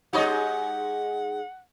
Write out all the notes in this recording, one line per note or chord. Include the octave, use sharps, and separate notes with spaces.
G#3 D#4 G4 C#5 D#5 F#5